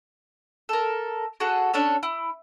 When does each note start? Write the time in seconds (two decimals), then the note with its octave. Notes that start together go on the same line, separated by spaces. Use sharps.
0.69 A4 A#4
1.40 F#4 G#4 A4 F#5
1.74 C#4 D4 A4 C#5
2.03 E4